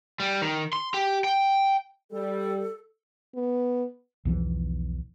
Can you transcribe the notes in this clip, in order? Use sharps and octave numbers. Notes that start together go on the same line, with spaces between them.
G3
D#3
C6
G4
G5
G3 A4
B3
B1 E2 E3 F3